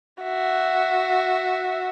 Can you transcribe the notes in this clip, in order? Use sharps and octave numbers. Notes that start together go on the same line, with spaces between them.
F#4 E5